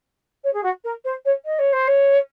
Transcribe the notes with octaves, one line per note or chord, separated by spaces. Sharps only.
C#5
G#4
F#4
A#4
C5
C#5
D#5
C#5
C5
C#5